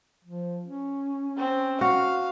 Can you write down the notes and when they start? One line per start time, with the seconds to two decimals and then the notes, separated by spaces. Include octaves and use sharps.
0.24 F3
0.66 C#4
1.37 C4
1.81 F#4 F5